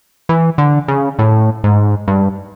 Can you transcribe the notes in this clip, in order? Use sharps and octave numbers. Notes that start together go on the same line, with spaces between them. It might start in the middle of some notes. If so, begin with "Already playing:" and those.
E3
D3
C#3
A2
G#2
G2